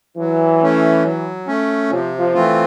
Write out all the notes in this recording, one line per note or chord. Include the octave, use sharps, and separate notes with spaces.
E3 F#3
A3 C#4
F#3
A3 C#4
C3 F3
F3
E3 A3 C4 F4